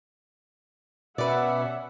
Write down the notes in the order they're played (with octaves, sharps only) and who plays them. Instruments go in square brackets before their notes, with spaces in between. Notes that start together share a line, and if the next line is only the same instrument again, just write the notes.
[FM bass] B2 [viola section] C#4 E5 F#5 [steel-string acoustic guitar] B4 D5